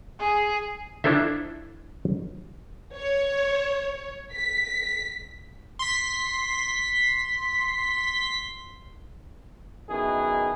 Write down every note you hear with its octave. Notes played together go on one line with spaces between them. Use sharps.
G#4
D4 E4 F4 A4 C5 E5
C#5
B6
C6 B6
F#2 B2 D#3 E4 G#4